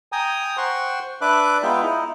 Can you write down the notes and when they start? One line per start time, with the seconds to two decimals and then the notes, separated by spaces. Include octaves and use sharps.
0.12 G5 G#5 A#5 D#6
0.57 C5 F#5 G5 C6 C#6
1.21 D4 B4 E5 D6 F#6
1.63 G#3 B3 D#4 F4 E5 G5
1.81 D#4 E4